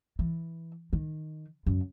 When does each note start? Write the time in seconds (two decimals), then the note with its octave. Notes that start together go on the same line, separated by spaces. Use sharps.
0.19 E3
0.93 D#3
1.66 F#2